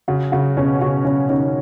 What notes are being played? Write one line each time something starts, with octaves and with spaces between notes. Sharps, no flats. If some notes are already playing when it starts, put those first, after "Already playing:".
C#3 F#4
C#3 F#4
B2 C#4
C#3 F#4
C#3 C#4
D#3 C#4